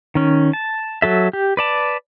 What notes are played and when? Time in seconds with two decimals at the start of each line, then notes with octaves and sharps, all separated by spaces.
0.15 D#3 C#4
0.53 A5
1.02 F#3 A4 E5
1.33 G4
1.57 B4 D5 A5